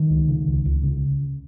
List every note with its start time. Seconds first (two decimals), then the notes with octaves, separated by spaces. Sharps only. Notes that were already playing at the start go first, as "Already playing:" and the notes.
Already playing: D#3
0.10 C#2
0.28 C#3
0.48 C#2
0.66 C#2
0.83 C#3